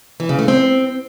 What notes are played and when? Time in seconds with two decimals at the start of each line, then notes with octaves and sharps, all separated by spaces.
0.20 E3
0.29 C#3
0.39 A3
0.48 C4